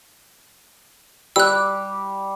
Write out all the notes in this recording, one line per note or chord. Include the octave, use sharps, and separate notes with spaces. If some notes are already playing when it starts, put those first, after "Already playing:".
G3 G4 D6 E6 F#6